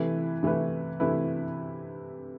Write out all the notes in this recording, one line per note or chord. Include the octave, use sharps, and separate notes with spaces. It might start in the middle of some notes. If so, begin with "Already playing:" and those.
Already playing: C3 E3 A3 E4 B4
C3 E3 A3 E4 B4
C3 E3 A3 E4 B4